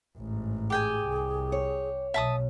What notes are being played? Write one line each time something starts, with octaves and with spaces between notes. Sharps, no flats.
A1 G#2
G4 G#4 G5 G#5
C2
C#5
B1 B2 E5 A5 D#6